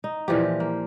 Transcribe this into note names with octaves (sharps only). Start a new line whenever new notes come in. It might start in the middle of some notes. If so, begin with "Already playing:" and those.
D#4
A#2 E3 F3 G4
A#3